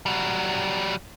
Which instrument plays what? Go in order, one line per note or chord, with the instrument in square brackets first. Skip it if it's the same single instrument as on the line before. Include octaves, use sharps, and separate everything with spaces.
[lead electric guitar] F#3 G3